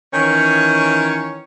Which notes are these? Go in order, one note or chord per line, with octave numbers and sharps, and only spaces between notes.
D#3 E3 C#4 C#5